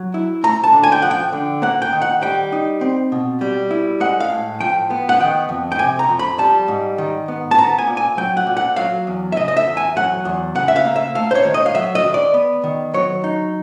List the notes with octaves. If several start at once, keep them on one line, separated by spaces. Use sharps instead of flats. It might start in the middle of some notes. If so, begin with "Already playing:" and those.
Already playing: F#3
E4
A3 A#5
A5
D3
G#5
G5
F3 F#5
G5
D3
A#3 F#5
G5
D#3
F#5
G3 G5
D#4
C4
B2
G3
E4
G#3 F#5
F5
A2
F3 G5
B3
F#5
D#3 G5
F2
G5
C3 G#5
A#5
F2
B5
G3 A5
G#2
D#3
B3
A5
B3 A#5
G#5
A#2
G#5
F#3 G5
F#5
A#2
F#5
F#3 F5
E2
E5
C#3 D#5
D#5
E5
E2
G#5
F#3 F#5
E2
C#3 F#5
E5
F5
A#3
E5
A3 F5
C5
C#5
D#3
D#5
F5
F#3 E5
D#5
D#3
D5
B3
D#3
F#3 C#5
D#4